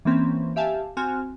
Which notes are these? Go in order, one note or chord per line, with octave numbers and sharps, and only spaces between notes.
E3 A#3 C4 C#4
G4 E5 F5 G#5 A5
C4 F#4 G#5 F6